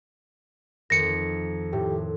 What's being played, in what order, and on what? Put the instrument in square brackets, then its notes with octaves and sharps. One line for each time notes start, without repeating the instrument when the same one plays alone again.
[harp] F2 D#3 [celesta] A#6 C#7
[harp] A2 [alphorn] G4